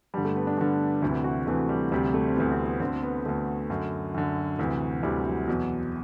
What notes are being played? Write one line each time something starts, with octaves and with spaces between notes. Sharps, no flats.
G2 D3 G3
A3
B3
D4
G2 D3 D4
D2 C3 E3 E4
F#4
D2 C3 E3 A3
G3
D2 C3 E3 G3
A3
C4
D2 C3 E3 B3
C4
B3
D2 D3 C4
B3
D2 D3 A3
F#2 D3
F#2 D3
D2 C3 E3
D2 C3 E3 G3
F#3
E2 B2 F#3